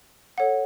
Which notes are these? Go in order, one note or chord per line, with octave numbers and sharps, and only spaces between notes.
A4 C#5 F#5